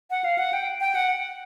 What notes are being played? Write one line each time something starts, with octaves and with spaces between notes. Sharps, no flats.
F#5
F5
F#5
G5
G5
F#5